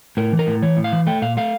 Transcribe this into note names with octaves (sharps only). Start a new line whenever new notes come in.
A2 A#4
E3
A#4
A2
E3 C#5
A2
F5
E3
A3 G5
A#2 F5
A3 F5